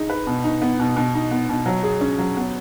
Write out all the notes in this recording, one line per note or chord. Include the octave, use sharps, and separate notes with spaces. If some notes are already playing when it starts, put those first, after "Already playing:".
Already playing: D#4 G#4
B4
B2
D#4
B3
B2
B2
D#4
B3
B2
F#3
G#4
C#4
F#3
B3